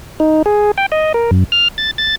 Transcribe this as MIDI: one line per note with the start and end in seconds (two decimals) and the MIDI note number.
0.20 0.42 63
0.46 0.71 68
0.78 0.86 79
0.92 1.13 75
1.14 1.31 70
1.31 1.44 42
1.52 1.68 89
1.78 1.91 93
1.98 2.15 93